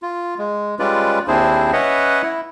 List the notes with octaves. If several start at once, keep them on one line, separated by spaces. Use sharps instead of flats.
F4
G#3
G3 G#3 C#4 F4 B4 D5
D#2 C4 D4 E4 G#4 C5
C#4 B4 C#5 D#5 E5 F#5
E4